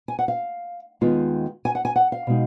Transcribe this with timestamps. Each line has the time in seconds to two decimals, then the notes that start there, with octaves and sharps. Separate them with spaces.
0.08 G#5
0.19 F#5
0.28 F5
1.01 D#2 D#3 G#3 B3 F4
1.65 G#5
1.75 F#5
1.85 G#5
1.96 F#5
2.12 F5
2.27 B2 G#3 D#4